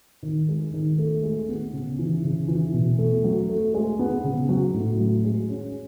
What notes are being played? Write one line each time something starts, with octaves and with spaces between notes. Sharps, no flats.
D#3
G#3
D#3
A3
G#3
B3
C#3
E3
C#3
E3
B2
A3
F#3
A3
G#3
B3
C#3
F#3
A2
F#3
G#3
C#4